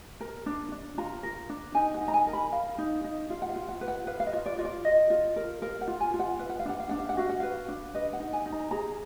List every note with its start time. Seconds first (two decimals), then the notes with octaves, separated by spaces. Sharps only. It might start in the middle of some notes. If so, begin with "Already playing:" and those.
0.21 A#4 A#5
0.46 D4
0.72 D4
0.98 F4 A#5
1.23 A#4
1.49 D4
1.75 D#4 G#5
1.94 F#5
2.01 D#4
2.08 A#5
2.14 G#5
2.26 A#4
2.33 B5
2.52 A#4 F5
2.78 D#4
3.04 D#4
3.30 F4 F5
3.42 F#5
3.49 F5
3.56 F4
3.69 F#5
3.81 B4
3.88 F#5
4.07 B4 F5
4.20 F5
4.27 D#5
4.33 F4
4.46 D5
4.59 F4 D#5
4.65 D5
4.85 F4 D#5
5.10 F4
5.36 A#4
5.62 A#4 F5
5.81 F#5
5.88 F4
6.00 G#5
6.14 F4
6.19 F#5
6.39 B4 F5
6.49 F#5
6.59 F5
6.65 D4 F#5
6.80 F5
6.89 D4 F#5
7.00 F5
7.09 F#5
7.17 F#4 F5
7.29 F#5
7.40 B4 F5
7.68 D4
7.94 B4 D#5
8.13 F#5
8.20 D#4
8.33 G#5
8.46 D#4
8.52 A#5
8.71 G#4 A#5